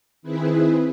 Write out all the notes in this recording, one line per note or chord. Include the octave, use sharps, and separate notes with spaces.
D#3 C4 E4 G#4 B4